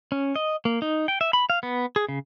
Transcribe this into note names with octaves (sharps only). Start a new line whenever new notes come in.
C#4
D#5
A#3
D#4
G5
E5
B5
F5
B3
G#4
C#3